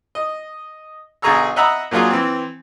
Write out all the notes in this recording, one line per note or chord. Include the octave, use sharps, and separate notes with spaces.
D#5
B1 D3 G#4 A#5 C#6 E6
D#5 E5 F#5 A#5 B5 E6
A#2 F#3 D4 F4 G#4
E3 C4